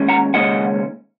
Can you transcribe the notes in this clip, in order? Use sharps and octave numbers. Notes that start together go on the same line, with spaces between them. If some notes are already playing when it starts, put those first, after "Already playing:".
Already playing: D#2 G#3 C#4
F#5 A#5
D#2 C#3 G#3 C#4 D#5 F#5